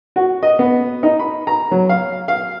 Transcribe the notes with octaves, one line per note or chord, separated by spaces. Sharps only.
F#4
D#5
B3
D#4
B5
A#5
F#3
F5
F5